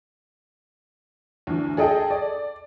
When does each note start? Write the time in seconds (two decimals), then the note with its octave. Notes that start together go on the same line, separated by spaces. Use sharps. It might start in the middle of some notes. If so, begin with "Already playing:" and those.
1.47 D2 E3
1.77 G#4 A4 D#5 G5
2.11 D5